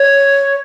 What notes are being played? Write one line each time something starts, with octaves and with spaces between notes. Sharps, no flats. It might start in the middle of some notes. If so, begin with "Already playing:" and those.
Already playing: C#5